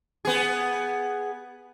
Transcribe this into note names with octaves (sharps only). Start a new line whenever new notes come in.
B3 G#4